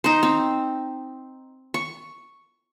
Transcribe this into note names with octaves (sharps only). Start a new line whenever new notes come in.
D#4 C5
C4
C#6